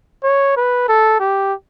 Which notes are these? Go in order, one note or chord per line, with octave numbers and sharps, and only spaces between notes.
C#5
B4
A4
G4